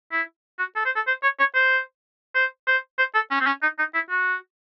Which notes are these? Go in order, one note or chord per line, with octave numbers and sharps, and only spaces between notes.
E4
F#4
A4
C5
A4
C5
C#5
C#5
C5
C5
C5
C5
A4
C#4
C4
C#4
D#4
D#4
E4
F#4